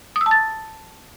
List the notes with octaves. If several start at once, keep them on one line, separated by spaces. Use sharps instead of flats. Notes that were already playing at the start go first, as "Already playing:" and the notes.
D#6
E6
A5
A6